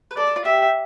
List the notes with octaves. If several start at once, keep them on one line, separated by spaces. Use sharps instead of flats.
B4
A4 D5
A4
F4
G4 E5